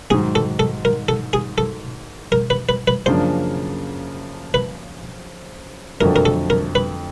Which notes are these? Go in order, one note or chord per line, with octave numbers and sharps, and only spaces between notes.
G#2 D#3 F#3 G#4
A4
A4
A#4
A4
G#4
A4
A#4
B4
B4
B4
F#2 C#3 F3 A#3 D4 C5
B4
F2 D3 F#3 A3 A#4
A#4
A4
A#4
B4